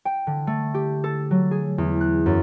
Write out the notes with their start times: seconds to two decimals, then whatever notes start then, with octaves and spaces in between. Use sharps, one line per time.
0.05 G5
0.27 D3
0.47 A3
0.74 G4
1.04 A4
1.31 F#3
1.51 G#4
1.78 E2
2.01 F#6
2.26 F#2